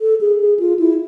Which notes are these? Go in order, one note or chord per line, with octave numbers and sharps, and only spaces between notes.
A4
G#4
G#4
F4
E4